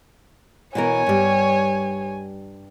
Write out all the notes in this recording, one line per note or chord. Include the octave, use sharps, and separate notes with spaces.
B2 E3 A#4 C#5 G#5
G2 G3